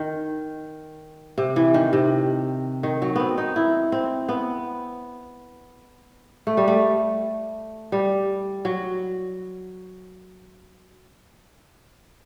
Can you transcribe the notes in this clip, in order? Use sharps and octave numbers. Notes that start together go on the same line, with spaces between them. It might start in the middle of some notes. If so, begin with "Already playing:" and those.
Already playing: D#3
C3
E3
D#3
C3
D#3
F#3
B3 C4
D#4
E4
C4
B3
A3
G3
A3
G3
F#3